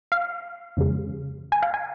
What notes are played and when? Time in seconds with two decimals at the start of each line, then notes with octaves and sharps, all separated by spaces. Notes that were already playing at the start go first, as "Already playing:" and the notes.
0.12 F5
0.77 F2 C#3 G#3
1.52 G#5
1.62 F5
1.74 G#5